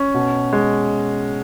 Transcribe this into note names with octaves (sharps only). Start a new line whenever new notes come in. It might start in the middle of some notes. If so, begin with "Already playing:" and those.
Already playing: C#4
B2
G#3